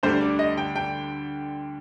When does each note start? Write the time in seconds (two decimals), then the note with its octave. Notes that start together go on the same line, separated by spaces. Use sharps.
0.03 D2 D3 G3 D4 C5
0.21 D5
0.39 D#5
0.58 G5
0.76 G5